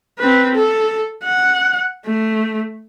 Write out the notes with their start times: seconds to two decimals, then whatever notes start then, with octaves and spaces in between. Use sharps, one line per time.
0.19 C4 B4
0.55 A4
1.24 F#5
2.06 A3